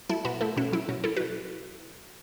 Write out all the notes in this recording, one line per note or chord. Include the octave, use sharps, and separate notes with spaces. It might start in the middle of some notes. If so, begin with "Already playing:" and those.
F#3 E4 A4
B2 F#4 B4
A3 E4 A4
B2 C#4 F#4
F#3 E4
B2 C#4 F#4
F#3 E4 A4
F#4 B4
B2